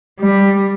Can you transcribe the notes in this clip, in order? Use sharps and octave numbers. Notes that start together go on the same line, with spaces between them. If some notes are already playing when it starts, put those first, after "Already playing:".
G3